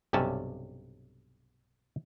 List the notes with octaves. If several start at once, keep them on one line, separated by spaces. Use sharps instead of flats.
B1 G2 C3 C#4 A5